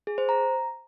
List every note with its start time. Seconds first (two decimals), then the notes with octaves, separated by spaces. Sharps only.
0.07 G#4
0.18 C5
0.29 A#5